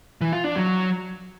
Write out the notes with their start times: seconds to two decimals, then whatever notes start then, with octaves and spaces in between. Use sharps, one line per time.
0.21 E3
0.33 F4
0.44 D4
0.56 F#3